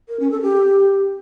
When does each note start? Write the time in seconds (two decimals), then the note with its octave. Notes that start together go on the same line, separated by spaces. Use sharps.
0.09 A#4
0.20 C#4
0.31 A4
0.42 G4